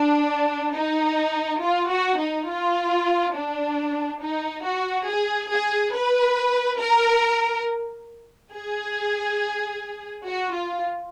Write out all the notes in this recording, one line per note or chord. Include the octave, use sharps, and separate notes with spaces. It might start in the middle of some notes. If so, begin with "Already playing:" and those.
Already playing: D4
D#4
F4
F#4
D#4
F4
D4
D#4
F#4
G#4
G#4
B4
A#4
G#4
F#4
F4